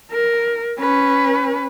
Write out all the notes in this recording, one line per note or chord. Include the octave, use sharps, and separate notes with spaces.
A#4
C#4 B4